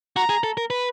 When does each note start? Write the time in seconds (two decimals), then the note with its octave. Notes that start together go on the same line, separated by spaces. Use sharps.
0.16 F#4 A#5
0.29 G#4
0.44 A4
0.57 A#4
0.70 B4